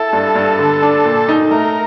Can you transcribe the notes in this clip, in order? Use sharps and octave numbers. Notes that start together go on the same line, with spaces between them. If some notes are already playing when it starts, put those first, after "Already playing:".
Already playing: E4 A4
G2
G2
D3
D4
A#2
D#4
A3 A#4